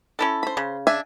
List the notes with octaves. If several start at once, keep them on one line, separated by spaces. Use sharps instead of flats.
C#4 E4 A4
C5 B5
C#3
D4 E5 G#5